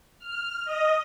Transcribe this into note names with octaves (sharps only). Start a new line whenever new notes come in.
F6
D#5